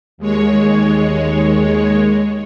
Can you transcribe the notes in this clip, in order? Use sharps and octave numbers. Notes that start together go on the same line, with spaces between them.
D#2 G#3 C#5